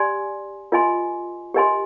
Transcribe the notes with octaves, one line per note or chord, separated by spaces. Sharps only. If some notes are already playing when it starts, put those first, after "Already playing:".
Already playing: G4 D5 G#5 C6
F4 A#4 D#5 G#5 C6
G4 A#4 D#5 G#5 C6